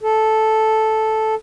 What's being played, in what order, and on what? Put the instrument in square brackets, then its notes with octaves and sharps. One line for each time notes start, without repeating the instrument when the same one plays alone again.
[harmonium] A4